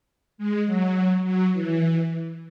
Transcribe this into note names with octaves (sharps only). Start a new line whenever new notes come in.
G#3
F#3
F#3
E3